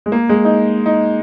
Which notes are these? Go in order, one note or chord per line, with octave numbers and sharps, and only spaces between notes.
G#3
A#3
G#3
D#4
D#4